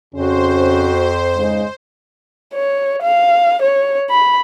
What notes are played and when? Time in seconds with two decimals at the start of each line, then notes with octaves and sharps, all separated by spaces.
0.14 F2 C#3 C#4 F#4 C5
1.36 G#2 C#3 G#3
2.54 C#5
3.02 F5
3.62 C#5
4.10 B5